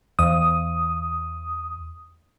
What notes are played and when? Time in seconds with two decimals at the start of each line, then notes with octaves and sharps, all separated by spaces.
0.19 E2 D#6